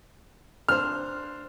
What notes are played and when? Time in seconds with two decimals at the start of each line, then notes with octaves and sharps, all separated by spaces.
0.69 D4 C5 F6